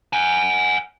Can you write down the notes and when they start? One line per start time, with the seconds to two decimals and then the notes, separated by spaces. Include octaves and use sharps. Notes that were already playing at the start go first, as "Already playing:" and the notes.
0.13 F#5 G#5